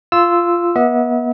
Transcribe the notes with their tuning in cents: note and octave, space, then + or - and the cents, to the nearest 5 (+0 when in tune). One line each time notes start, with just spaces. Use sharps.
F4 -10 E6 +0
B3 -30 E5 -40